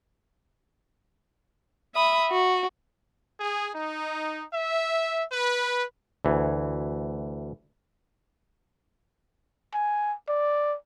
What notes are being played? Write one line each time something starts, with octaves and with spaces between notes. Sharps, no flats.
E5 B5 D#6
F#4
G#4
D#4
E5
B4
D2 E3
G#5
D5